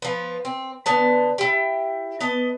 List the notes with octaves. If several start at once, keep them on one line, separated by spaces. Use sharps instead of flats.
F3 B3
C4
D3 B3 A5
E4 G4
B3 D#5 A5